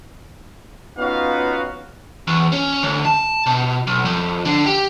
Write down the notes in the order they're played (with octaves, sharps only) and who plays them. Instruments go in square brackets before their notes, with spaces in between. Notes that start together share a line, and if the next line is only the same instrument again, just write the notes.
[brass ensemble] B3 C#4 D#4 F4 F#4 F5
[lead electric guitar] E2
C#4
D2
A5
B2
B1
F2
D3
G4